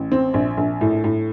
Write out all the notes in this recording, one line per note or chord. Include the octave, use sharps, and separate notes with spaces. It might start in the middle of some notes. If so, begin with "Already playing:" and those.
Already playing: A1
C4
A#1
A#1
A2
A2